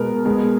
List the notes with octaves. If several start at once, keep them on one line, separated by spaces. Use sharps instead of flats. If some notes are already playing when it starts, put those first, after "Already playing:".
Already playing: B2 G#3 B3 A#4
B2 G#3 B3